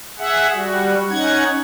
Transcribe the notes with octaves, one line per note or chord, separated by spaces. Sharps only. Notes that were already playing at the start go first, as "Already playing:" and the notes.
G#4 E5 F#5
G3 F#4
C#4 D#4 F#5 G#6